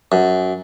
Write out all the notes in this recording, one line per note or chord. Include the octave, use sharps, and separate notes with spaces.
F#2